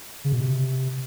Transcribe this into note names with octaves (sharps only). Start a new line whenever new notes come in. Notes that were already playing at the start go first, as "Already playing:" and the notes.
C#3
B2
C3